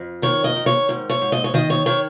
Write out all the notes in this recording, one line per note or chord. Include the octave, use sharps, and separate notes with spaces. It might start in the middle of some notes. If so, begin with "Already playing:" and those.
Already playing: F2
D#3 C#5
D#5
D#3
C#5
G#2
C#5
G#2
D#5
C#5
D#3 D#5
C#5
D#3 C#5